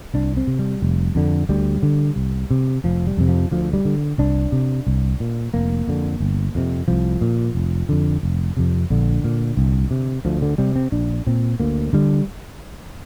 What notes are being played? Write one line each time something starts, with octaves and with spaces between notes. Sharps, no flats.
C2 D4
C4
C3
G3
F1
F2 D3
D2 G3
D3
C2
C3
F1 F3
G3
F2 C3
F3
D2 F3
G3
D3
C2 D4
C3
C2
A#2
F1 A#3
F2 D3
G1
F2 C3
C2 F3
A#2
F1
F2 D3
F1
F2 C3
A#1 D3
A#2
C2
C3
D2 F3
D3
C3 G3
C4
A#1 D4
A#2 C4
D2 A#3
D3 G3